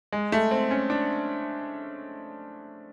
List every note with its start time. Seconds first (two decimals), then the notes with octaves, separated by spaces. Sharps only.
0.13 G#3
0.32 A3
0.51 C4
0.71 C#4
0.90 D4